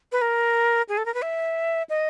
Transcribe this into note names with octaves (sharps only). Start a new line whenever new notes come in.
B4
A#4
G#4
A4
A#4
B4
E5
D#5